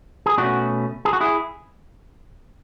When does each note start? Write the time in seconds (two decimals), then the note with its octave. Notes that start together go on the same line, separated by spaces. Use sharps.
0.26 G#4
0.38 B2 A3 C#4 D4 F#4
1.05 G#4
1.13 F#4
1.21 E4 G#4